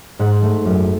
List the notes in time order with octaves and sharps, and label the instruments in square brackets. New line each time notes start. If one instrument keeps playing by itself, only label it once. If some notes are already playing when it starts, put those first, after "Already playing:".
[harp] G#2 F#5
A3
F#2